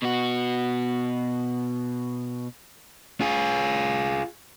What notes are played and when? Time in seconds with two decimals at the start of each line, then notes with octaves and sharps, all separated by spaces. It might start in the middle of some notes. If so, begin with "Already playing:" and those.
0.03 B2 F#4
3.21 F4 G#4